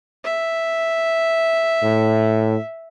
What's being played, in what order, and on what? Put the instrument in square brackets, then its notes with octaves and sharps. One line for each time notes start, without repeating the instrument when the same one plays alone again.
[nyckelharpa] E5
[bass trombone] A2